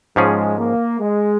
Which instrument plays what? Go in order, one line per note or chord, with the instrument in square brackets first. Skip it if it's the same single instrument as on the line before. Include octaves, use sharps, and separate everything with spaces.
[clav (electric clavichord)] G#2 F3 C#4 G#4 [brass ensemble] G#3
[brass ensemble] A#3
G#3